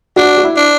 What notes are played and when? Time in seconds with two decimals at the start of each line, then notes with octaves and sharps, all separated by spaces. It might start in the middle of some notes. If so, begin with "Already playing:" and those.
0.16 D4 F#4
0.37 F#4
0.44 E4
0.57 D4